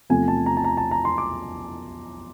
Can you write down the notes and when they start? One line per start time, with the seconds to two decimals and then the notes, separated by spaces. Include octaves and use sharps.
0.10 E2 C3 F3 A3 C4 G#5
0.28 A5
0.46 A#5
0.57 A5
0.64 A#5
0.77 A5
0.91 A#5
1.05 C6
1.18 D6